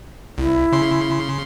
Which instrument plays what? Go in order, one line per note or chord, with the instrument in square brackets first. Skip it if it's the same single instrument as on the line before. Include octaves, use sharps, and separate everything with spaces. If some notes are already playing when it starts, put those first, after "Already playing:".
[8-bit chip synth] C2 [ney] E4
[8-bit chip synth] C#3 C6